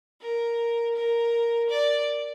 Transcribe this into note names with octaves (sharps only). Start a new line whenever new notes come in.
A#4
A#4
D5